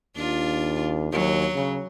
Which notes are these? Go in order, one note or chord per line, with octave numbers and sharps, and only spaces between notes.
D#2 D4 F4
D#2 F#3
C#3